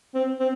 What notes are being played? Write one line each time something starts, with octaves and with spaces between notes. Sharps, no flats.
C4
C4